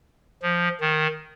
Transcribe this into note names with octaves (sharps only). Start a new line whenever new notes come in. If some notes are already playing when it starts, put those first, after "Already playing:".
F3
D#3